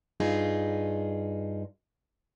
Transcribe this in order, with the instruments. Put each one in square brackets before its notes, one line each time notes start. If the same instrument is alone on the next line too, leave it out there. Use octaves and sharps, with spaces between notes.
[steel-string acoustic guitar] G2 D#4 F4 G#4